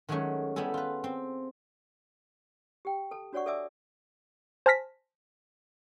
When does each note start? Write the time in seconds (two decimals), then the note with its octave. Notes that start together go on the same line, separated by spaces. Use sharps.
0.09 D#3 F#3 G#3 A3 C#4
0.56 G3 B3 E4 G#4 A4
0.74 F4 B4
1.04 C4
2.85 G4 G5
3.11 A4 A5
3.33 D4 F#4 C#5 D5 F#5 C#6
3.46 A4 D5 E5 G#5 D6 E6
4.66 C5 G#5 A5 F6 A#6 B6